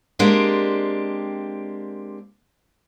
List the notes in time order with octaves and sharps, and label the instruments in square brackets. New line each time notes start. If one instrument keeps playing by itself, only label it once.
[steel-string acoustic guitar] G#3 A#3 C4 D4 G4